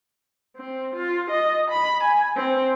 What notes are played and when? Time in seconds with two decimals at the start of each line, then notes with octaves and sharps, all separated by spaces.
0.57 C4
0.95 F4
1.31 D#5
1.71 B5
2.04 G#5
2.37 C4